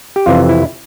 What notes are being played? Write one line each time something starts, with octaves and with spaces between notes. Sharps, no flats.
G4
F2 C3 E3 F4
E4